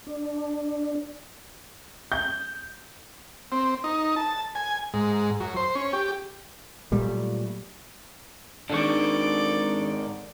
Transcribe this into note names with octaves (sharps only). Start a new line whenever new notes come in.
D4
G6
C4
D#4
A5
G#5
G#2
F#2
C5
C#4
G4
A#2 F#3 G3 A3
G#2 D#3 D4 A4 D5 C#6